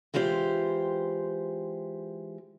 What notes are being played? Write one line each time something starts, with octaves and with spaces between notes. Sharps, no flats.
E3 G#3 F4 G4 C5